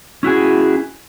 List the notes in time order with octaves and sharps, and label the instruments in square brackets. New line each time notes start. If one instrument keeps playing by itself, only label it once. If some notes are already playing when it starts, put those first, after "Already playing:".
[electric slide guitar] C#4 E4 F#4 G#4